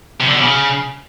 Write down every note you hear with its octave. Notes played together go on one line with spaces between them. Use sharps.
C3
D3
B2
C#3